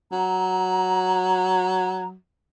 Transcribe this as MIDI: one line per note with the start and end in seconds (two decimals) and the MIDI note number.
0.12 2.15 54
0.12 2.07 82